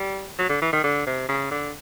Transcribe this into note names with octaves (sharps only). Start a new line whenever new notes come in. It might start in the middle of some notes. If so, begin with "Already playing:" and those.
Already playing: G3
F#3
D3
E3
D#3
D3
C3
C#3
D3